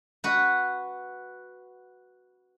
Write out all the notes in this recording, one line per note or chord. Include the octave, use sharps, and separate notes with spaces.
F#4 B4